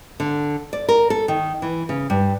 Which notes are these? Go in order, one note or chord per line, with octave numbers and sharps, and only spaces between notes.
D3
D5
A#4
A4
D#3
E3
C#3
G2